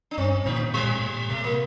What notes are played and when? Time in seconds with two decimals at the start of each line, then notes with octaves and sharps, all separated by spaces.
0.11 D4
0.18 G2 C4
0.46 A#2 D3
0.74 G3
0.84 A#2
0.92 A2
1.02 A#2
1.29 C3 A3
1.44 A#3